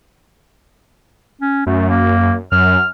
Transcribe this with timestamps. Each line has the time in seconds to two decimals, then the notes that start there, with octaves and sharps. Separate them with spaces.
1.41 C#4
1.67 F#2 A3
1.89 A#3
2.52 F#2 F6